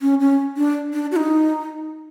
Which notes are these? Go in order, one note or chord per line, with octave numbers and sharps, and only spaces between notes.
C#4
C#4
D4
D4
F#4
D#4